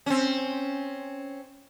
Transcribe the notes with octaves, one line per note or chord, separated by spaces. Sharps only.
C4 C#4